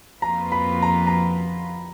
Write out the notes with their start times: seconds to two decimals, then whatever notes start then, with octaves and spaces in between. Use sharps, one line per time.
0.22 F2 F3 A#3 F4 B4 A#5
0.52 B5
0.82 A#5
1.07 A#5